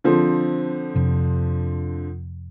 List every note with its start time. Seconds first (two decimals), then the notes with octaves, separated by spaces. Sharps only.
0.04 D3 F3 C4
0.95 F2 C3